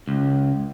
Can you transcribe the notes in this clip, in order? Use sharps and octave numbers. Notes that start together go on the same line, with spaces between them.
C#2